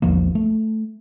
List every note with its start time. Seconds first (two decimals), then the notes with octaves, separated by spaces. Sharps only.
0.02 A#1 E2 F3 A#3
0.35 A3